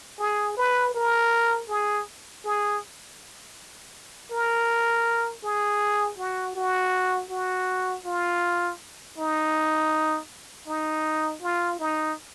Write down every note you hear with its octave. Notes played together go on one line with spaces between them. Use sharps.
G#4
B4
A#4
G#4
G#4
A#4
G#4
F#4
F#4
F#4
F4
D#4
D#4
F4
D#4